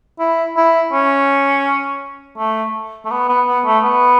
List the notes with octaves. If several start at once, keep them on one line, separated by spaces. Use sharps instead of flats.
E4
E4
C#4
A3
A3
B3
B3
B3
A3
B3